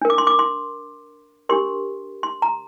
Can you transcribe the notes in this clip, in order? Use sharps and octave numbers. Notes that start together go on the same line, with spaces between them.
D4 A#4
D6
C6
D6
C6
D4 G4 A#4 C6
C6
A#5